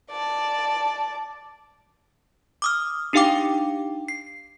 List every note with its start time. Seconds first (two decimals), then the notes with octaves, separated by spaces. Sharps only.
0.11 D5 A5
2.62 D6 D#6 F6
3.13 D4 D#4 G4 F5 G5 D6
4.08 C7